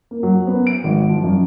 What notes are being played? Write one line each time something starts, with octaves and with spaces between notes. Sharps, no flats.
A#3
F#3
B3
D7
G#1
F3
F#2